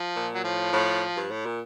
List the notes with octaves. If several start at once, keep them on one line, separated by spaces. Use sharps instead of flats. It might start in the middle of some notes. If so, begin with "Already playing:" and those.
Already playing: F3
A#2
F#3
A2 F3
A2
G2
A2
A#2